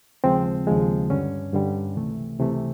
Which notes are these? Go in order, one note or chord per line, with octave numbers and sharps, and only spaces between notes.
D#2 C#3 F3 G#3 C4
D#2 C#3 F3 G#3
G2 D3 G3 C#4
G2 D3 G3
C#2 C3 E3 A3
C#2 C3 E3 A3